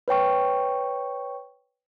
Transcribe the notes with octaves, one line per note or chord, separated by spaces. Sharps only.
B4 C#5 G5 C#6